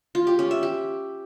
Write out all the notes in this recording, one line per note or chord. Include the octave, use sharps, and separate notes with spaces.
F4
G4
C#4
E5
G4